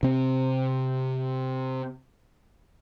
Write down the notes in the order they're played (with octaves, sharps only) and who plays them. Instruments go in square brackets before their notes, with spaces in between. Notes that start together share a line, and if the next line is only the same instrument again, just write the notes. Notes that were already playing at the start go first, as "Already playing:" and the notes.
[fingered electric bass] C3 C4